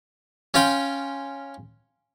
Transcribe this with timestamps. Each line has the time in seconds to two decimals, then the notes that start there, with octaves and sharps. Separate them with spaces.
0.54 C#4 F4 F5 G5